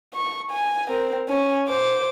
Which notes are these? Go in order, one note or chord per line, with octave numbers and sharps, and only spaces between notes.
C#6
G#5
C4 A#4
C#4 G#5
C5 D6